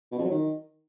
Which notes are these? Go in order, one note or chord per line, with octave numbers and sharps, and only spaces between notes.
B2
F2
F#3
D#3